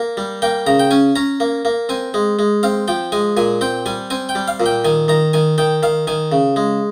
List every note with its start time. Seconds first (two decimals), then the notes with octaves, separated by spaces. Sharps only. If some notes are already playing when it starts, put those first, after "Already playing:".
Already playing: A#3
0.17 G3
0.42 A#3 G5
0.67 C#3 A#5
0.79 G5
0.91 C#4 G#5
1.16 C#4 A#5
1.40 A#3
1.65 A#3
1.89 C4 G#5
2.14 G#3
2.39 G#3
2.63 C4 F5
2.88 F3 G5
3.12 G#3 G#5
3.37 A#2 G#5
3.61 C4 G5
3.86 G3 G#5
4.10 C4 G#5
4.29 G5
4.35 G3
4.48 F5
4.60 A#2
4.66 G5
4.85 D#3 G#5
5.08 D#3 A#5
5.33 D#3 G#5
5.58 D#3 G5
5.83 D#3 F5
6.07 D#3 G#5
6.32 C#3
6.56 G#3